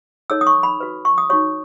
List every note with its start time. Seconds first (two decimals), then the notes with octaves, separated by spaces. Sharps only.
0.30 D#4 A4 C#5 E6
0.41 D#6
0.47 C#6
0.63 B5
0.80 F#4 B4
1.05 C#6
1.18 D#6
1.30 D#4 F#4 C#5 C#6